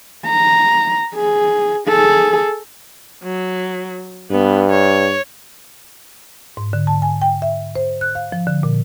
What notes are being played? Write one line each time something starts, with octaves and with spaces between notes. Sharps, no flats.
A#5
G#4
G#4 A4
F#3
G2 B3
C#5
G#2
D3
A5
G#5
G5
E5
C5
F#6
F5
F3
D3
A#2